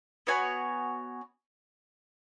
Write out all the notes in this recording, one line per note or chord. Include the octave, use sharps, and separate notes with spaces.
B3 F#4 C#5 G#5